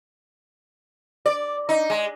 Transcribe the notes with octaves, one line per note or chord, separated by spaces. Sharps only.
D5
D#4
G#3